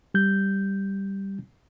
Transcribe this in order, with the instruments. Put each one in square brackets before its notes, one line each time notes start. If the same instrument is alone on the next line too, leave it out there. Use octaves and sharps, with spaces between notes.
[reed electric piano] G3 G6